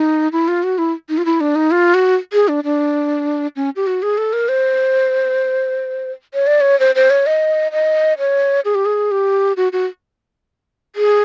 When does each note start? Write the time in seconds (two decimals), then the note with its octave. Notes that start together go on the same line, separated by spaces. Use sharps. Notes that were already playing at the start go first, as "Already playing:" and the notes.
Already playing: D#4
0.32 E4
0.48 F4
0.63 F#4
0.78 E4
1.09 D#4
1.18 F4
1.25 E4
1.40 D4
1.55 D#4
1.71 F4
1.94 F#4
2.33 G#4
2.48 D4
2.64 D4
3.56 C#4
3.76 G4
3.87 F#4
4.02 G#4
4.18 A4
4.33 A#4
4.49 C5
6.34 C#5
6.47 D5
6.61 C#5
6.80 C5
6.95 C5
7.10 C#5
7.26 D#5
7.72 D#5
8.19 C#5
8.65 G#4
8.75 G4
8.85 G#4
9.11 G4
9.57 F#4
9.73 F#4
10.96 G#4